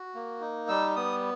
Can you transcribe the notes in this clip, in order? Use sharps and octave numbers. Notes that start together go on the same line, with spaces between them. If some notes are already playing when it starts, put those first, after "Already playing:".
Already playing: F#4
A#3
D#4
G3 E6
B3 D#6